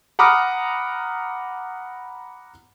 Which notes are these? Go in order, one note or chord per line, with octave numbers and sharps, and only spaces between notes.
F#5 A#5 B5 D6 D#6 F6